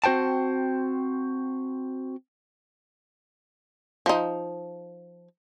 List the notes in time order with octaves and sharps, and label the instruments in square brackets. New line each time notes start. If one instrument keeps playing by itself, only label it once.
[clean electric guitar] C4 F#4 C5 G5 A5
[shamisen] F3 D#4